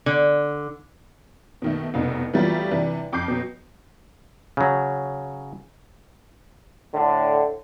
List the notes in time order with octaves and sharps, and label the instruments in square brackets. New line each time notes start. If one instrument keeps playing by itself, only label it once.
[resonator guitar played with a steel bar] D3
[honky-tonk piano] B2 D#3 A3
F1 C2 B2 D#4
E3 F#3 G3 A3 B3 F4
C3 E3 D4
F2 D6 G6 C7
B2 F#3
[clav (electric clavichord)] C#3 F#3
[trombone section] A2 D3